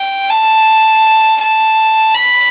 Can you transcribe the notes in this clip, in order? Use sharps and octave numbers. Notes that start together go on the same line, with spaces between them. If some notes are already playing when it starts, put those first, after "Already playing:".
Already playing: G5
A5
A5
B5